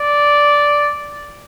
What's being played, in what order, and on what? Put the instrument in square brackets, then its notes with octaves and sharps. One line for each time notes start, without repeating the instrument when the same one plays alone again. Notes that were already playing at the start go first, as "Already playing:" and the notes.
Already playing: [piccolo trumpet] D5